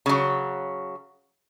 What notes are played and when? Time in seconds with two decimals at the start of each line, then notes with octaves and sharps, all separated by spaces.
0.06 C#3 F#3